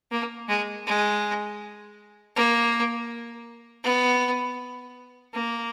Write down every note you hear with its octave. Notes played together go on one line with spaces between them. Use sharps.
A#3
G#3
G#3
A#3
B3
A#3